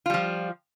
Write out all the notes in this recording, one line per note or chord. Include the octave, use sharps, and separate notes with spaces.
F3 G3 F4